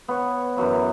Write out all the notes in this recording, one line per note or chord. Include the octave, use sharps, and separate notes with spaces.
B3 C#5
F#2 E3 F#3 B3